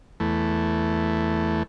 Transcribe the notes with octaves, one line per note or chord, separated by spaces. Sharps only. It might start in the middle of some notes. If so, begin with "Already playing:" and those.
E2 A3